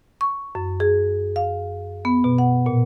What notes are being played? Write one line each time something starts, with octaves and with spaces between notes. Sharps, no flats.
C#6
F#2
G#4
F5
B3
B2
F#5
A#2